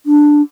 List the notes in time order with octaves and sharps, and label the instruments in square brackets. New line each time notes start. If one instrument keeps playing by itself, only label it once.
[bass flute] D4